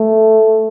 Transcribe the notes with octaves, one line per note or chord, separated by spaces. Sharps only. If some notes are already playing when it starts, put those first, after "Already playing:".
Already playing: A3